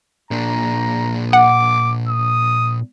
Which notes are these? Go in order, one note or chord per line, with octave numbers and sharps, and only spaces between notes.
A#2 D4 A#5
F#5 D6
D#6